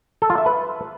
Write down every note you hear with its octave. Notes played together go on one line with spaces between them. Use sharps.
A4
F4
E5
B4